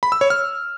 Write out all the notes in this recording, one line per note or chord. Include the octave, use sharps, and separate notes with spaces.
B5
E6
C#5
F6